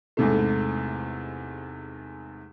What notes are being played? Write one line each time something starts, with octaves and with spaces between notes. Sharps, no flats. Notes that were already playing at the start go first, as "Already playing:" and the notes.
E2 G#2 C3 A3